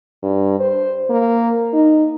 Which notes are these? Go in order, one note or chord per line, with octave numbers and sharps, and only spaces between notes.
G2
C5
A#3
D#4